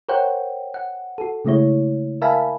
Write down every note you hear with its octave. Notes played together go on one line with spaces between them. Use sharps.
A#4 C5 C#5 F#5 G5
F#5
F#4 A4
C#3 G#3 A3 E4 C#5
A#4 E5 F5 G#5 A5 B5